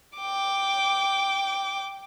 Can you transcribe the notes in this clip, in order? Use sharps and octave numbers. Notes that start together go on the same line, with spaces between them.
G5 D6